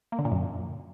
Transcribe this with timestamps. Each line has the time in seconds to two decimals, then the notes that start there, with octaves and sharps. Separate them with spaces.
0.12 A#3
0.19 D3
0.25 A#2
0.31 F#2